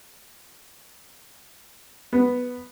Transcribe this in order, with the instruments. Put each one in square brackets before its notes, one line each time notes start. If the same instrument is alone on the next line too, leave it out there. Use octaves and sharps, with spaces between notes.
[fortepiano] B3